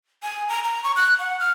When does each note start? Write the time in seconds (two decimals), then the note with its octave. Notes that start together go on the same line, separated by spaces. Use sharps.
0.23 G#5
0.49 A#5
0.64 A#5
0.84 C#6
0.96 F#6
1.19 F#5
1.40 F6